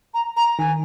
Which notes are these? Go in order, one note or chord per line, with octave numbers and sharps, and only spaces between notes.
A#5
A#5
D#3 G#5